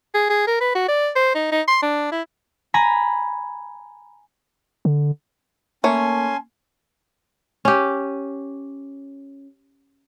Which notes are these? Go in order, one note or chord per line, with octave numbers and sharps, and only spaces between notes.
G#4
G#4
A#4
B4
F#4
D5
C5
D#4
D#4
C6
D4
E4
G#5 A#5 B5
D3
A3 A#3 C#4 C#5 G#5 A5 C6
C#4 G4